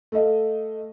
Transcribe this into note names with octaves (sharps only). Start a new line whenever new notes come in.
A3 A4 D#5 F5